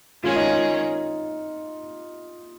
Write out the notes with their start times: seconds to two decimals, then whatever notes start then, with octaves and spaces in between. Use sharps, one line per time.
0.23 D#3 G#3 C#4 F4 G#4 C#5
0.36 D#4
0.47 F4